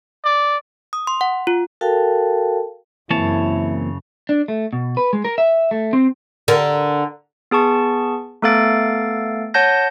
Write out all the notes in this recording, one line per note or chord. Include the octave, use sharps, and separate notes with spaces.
D5
D#6
C6
F#5
F4
F#4 A4 A#4 F5 G5 A5
F#2 C#3 E3 A#3 C4 E4 C#5 A5
D4
A3
B2
B4
G#3
A#4
E5
A3
C4
D3 A#4
B3 G#4 A5 C#6
A3 B3 A4 F5 A6 D7
C#5 F#5 A5 G6 A#6